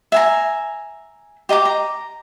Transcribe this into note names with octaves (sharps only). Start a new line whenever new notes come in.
E5 G#5 A#5
G4 D#5 A#5 D6
A#5